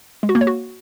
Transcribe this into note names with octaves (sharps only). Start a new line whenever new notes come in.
G#3
F#4
A#3
C#5
F#4